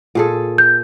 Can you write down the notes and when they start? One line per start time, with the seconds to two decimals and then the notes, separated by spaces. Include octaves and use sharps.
0.15 A#2 G#4 A4
0.58 G6